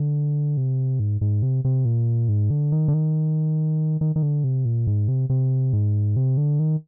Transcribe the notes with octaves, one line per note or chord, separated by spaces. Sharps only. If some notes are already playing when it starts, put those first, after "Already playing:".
Already playing: D3
C3
G#2
G#2
C3
C3
A#2
G#2
D3
D#3
D3
D#3
D#3
D#3
D3
C3
A#2
G#2
C3
C3
G#2
C3
D3
D#3